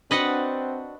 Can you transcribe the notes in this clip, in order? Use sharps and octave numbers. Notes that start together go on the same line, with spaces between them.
C4 D4 F#4 B4 D#5 F#5